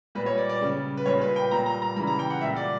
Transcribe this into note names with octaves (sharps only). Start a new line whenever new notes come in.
A#2 G3 B4
C#5
D5
D5
C#3 G3
B4
A#2 G3 C#5
B4
G5
A#2 G3 A#5
A#5
A#5
C#3 E3 G3 B5
A#5
G5
F#5
A#2 G3 E5
D5